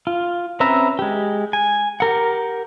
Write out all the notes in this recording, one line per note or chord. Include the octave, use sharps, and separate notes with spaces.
F4
C4 C#4 B4 E5 A#5
G#3 G4
G#5
G4 A#4 F#5